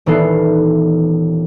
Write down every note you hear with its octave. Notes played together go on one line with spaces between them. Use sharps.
D#1 E3 B3 D#4 A4 C7